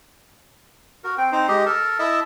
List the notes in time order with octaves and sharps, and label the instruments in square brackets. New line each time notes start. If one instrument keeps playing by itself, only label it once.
[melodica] F#4 A#4
C4 G5
C4 D#4 C5
G#3 G4 D#5
A4 A#4 A5
E4 D#5 E5 A5